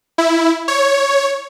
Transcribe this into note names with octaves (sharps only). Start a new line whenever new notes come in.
E4
C#5